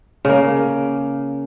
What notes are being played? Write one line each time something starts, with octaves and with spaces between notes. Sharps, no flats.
C#3 A#3